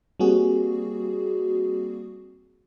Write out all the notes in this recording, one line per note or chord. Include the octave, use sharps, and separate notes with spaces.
G3 A#3 C4 F#4 G#4